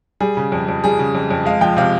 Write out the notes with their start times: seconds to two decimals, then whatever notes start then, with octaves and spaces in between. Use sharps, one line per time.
0.20 G3 G#4
0.37 C#3
0.52 F2
0.68 F2
0.84 G3 G#4
0.99 C#3
1.15 F2
1.31 F2
1.45 G#3 F5
1.61 F3 G5
1.77 C3 F5